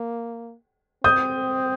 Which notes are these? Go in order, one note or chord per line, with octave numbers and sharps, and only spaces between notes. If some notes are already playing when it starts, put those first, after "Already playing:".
Already playing: A#3
C4 D#6 G6